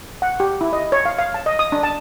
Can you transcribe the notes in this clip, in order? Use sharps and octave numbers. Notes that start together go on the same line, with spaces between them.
F#5
G4
E4
D#5
C#5
F5
F5
A5
D#5
D#6
D4
A5